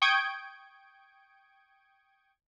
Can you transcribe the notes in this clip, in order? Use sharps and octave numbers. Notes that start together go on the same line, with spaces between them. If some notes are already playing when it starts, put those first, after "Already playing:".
G5 C#6 D#6 G6 G#6 D7